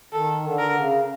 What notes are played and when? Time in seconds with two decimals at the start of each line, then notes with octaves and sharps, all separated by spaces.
0.12 D#3 A4
0.43 D3
0.58 A#4
0.74 C#3